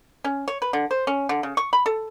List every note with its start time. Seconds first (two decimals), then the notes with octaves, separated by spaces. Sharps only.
0.24 C#4
0.48 C#5
0.62 B4
0.73 D3
0.91 C5
1.07 C#4
1.29 D3
1.43 C#3
1.57 C#6
1.73 B5
1.86 A4